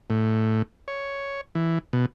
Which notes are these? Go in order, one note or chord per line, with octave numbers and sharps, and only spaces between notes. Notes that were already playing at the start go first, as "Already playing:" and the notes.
A2
C#5
E3
B2